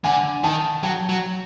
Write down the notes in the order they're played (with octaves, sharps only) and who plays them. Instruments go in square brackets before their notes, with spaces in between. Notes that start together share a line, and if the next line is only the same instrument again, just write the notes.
[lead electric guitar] D3 [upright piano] F#5 G#5
[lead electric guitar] D#3 [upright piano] G5 A5
[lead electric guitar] F#3 [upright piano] G5 A5
[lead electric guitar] F#3